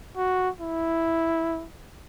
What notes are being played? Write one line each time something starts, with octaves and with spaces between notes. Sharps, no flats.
F#4
E4